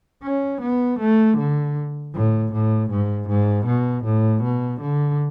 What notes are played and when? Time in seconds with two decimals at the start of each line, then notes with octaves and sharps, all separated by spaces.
0.23 C#4
0.61 B3
0.99 A3
1.37 D3
2.14 A2
2.52 A2
2.90 G#2
3.28 G#2
3.66 B2
4.05 A2
4.43 B2
4.81 D3